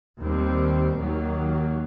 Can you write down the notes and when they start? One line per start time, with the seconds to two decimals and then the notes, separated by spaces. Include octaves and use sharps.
0.18 D#2 D#3 G3 C4
0.97 D#2 D#3 F#3 A#3